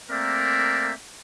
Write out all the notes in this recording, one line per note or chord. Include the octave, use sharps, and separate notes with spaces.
A3 A#3 C4 A#4 D5 E5